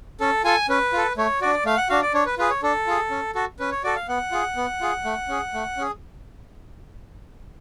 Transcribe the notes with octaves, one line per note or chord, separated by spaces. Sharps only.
C#4 A4
F4 A4 G#5
C#4 B4
F4 A4
A3 C#5
D4 F#4 D5
A3 F5
F#5
D4 F#4 F5
D5
D4 C#5
B4
F4 G#4 B4
C#5
D4 A4
F4 G#4
C#4
F#4 A4
C#4 B4
C#5
F#4 A4 D5
F5
B3 F#5
F4 G#4
B3
F4 G#4
A3
C#4 G#4
A3
C#4 G#4